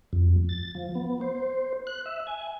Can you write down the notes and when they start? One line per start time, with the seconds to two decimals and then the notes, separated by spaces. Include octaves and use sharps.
0.13 F2
0.49 A6
0.75 F3
0.95 B3
1.21 C5
1.87 F#6
2.06 E5
2.27 G#5